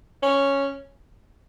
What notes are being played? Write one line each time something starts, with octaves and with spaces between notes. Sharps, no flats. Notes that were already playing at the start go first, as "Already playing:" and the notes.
C#4